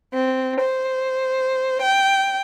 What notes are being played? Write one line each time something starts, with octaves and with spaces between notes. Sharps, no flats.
C4
C5
G5